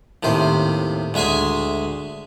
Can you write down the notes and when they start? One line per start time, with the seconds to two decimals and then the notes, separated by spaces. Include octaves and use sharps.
0.23 D#2 A2 C3 C5
1.14 D2 G#3 E5 G#5 C6